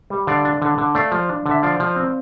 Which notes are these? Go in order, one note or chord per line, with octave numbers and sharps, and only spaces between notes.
G3
D3 D5 F5
D4
D3
D3
A3 D5 F5
F3
D4
D3
E5
F3 D5 F5
F3
C4